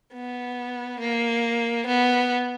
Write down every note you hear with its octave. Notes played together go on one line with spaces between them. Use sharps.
B3
A#3
B3